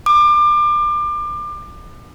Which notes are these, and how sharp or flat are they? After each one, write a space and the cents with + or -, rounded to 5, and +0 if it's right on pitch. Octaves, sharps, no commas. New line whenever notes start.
D6 +30